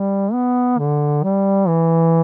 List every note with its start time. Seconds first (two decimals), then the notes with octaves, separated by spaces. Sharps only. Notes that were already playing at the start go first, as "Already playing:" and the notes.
Already playing: G3
0.33 B3
0.79 D3
1.24 G3
1.68 E3